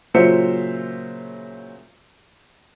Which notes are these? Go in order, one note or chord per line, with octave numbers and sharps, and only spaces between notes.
A#2 C#3 F#3 C5 E5 C#7